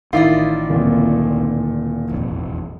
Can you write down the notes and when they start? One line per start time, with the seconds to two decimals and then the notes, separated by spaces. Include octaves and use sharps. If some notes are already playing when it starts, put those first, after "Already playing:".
0.13 A1 D#3 E4 F4 D5 D#5
0.69 D1 G#1 A#2
2.11 E1 A1 F2